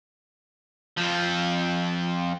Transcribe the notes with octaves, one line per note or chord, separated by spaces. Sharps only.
F2 F3